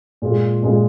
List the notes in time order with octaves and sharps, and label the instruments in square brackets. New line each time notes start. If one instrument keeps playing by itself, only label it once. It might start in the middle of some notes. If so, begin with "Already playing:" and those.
[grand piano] A#2 G#3 F4 G#4
A#2 G#3 F4 G#4